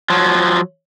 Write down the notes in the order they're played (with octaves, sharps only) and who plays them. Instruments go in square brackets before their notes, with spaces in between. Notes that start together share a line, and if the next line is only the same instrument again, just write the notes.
[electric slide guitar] F3 F#3